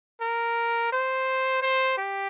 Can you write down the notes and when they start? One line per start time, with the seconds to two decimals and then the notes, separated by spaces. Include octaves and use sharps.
0.21 A#4
0.92 C5
1.62 C5
1.98 G4